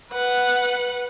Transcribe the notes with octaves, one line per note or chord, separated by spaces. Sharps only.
B4 F#5